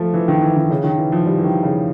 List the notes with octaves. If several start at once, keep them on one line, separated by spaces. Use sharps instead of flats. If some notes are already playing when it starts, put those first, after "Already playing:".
Already playing: F3 A3
E3
D#3
E3
D#3
C#3
D#3
E3
F3
G3
E3
D#3
C#3